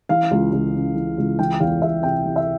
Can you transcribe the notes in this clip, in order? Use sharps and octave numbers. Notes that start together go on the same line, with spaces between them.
E3 F5
C#2
C#2
C#3
E3
C#2
E3 G5
E2 F5
E2 E5
C3 G5
E3
E5